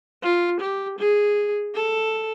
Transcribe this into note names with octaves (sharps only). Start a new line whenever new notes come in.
F4
G4
G#4
A4